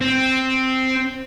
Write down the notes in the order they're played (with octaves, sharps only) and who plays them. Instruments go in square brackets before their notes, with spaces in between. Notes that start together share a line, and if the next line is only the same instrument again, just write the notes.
[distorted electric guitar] C4